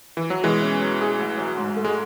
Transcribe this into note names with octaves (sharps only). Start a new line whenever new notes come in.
E3
F#3
B2 E3 G#3
C#4
F#3
G#4
A1
F#3
G#2
A3
G#3